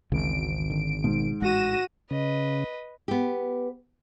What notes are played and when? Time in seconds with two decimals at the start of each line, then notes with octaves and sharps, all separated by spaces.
0.12 G#1 D2 C#3 E3 D7
0.70 D3
1.04 G#2 B2
1.42 A1 G#3 F#4 A#6 D#7 E7
2.11 C#3 B4 D#5
3.08 B3 G4